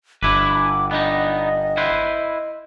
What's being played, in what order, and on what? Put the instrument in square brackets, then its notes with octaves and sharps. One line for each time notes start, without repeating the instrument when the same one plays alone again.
[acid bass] G1 [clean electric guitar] D4 E4 B4 [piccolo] D6
[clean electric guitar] B3 D4 D#4 [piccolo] D#5
[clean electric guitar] E4 B4 C5